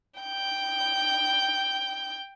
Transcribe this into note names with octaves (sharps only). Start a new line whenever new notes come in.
G5 G6